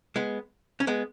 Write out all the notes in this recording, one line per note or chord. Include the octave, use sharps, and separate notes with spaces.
G#3 B3
C#4
G#3 B3